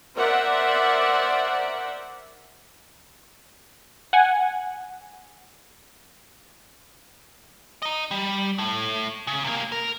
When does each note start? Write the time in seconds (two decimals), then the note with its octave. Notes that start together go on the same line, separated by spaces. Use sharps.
0.14 A#4 C5 D5 E5 F#5
4.13 F#5 G#5
7.82 D#5 A#5
8.11 G3
8.58 A2 A3
9.27 C#3
9.44 C3 A#3
9.72 A#4